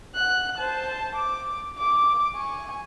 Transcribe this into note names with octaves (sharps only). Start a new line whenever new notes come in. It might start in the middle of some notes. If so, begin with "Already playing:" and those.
F#5 F#6
C5 A5
D6
D6
G#5 C#6